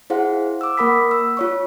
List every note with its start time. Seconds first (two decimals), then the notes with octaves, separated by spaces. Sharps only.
0.10 E4 G#4 C5 F5 F#5
0.61 D6 E6
0.77 A#3 A#4 F#5 B5 D#6 B6
1.11 E6
1.37 F4 C#5 C#6